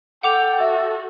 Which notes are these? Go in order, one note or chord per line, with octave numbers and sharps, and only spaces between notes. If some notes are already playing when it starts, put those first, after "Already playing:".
A4 F#5 G5 D6 F7
F#4 E5